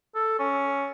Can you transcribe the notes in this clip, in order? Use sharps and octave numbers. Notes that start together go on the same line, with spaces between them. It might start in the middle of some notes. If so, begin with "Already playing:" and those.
A4
C#4